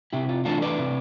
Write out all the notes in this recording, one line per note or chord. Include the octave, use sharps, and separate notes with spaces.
C3 E4 G4
F4
E3 A3 D4 F4 A4
B4 D5
C3